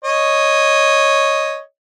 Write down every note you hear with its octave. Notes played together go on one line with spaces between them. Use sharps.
C#5 D#5